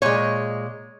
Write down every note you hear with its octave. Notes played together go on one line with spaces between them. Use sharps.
A#2 G#3 C#5